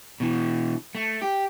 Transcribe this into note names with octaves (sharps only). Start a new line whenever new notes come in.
B2 E3
A3
G4